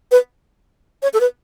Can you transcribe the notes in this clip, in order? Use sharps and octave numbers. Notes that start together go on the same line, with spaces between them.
B4
C#5
A4
B4